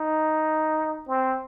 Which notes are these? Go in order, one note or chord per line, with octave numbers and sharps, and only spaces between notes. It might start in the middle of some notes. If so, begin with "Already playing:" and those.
Already playing: D#4
C4